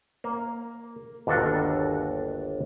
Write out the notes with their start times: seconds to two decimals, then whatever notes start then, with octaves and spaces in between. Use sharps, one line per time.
0.24 A#3
1.27 G1 D#2 D4 F#4 A4 A#4